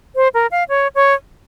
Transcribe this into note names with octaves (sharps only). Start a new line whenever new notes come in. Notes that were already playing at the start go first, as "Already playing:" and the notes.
C5
A#4
F5
C#5
C#5